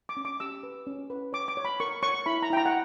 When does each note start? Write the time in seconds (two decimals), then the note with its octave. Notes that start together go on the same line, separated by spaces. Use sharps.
0.09 D6
0.17 C#4
0.25 D6
0.40 G4 E6
0.63 B4
0.87 C#4
1.10 B4
1.33 C#5 D6
1.48 D6
1.57 C#5
1.65 B5
1.80 A#4 C#6
2.03 C#5 C#6
2.26 E4 B5
2.42 A#5
2.50 E4 G5
2.57 A#5
2.66 F#5